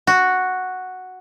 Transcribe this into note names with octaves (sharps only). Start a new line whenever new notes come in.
F#4